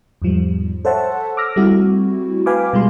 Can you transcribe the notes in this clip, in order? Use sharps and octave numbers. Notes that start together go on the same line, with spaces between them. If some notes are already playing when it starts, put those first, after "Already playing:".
E2 G#2 F3 G3
A4 C5 C#5 E5 F#5 A5
D6 E6 F6 A#6
G3 A3 C4 E4 F#4
B4 F5 G5 G#5 B5 D6
B2 G3 G#3 F4 C6